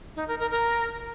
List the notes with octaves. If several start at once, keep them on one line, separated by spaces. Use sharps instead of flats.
D#4
A#4
A#4
A#4